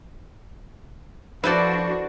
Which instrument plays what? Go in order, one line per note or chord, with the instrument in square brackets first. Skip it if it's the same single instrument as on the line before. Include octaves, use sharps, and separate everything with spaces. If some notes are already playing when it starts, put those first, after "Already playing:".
[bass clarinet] F3 [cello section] D4 F#4 [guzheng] E4 A4 [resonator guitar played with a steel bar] B4 C5 D5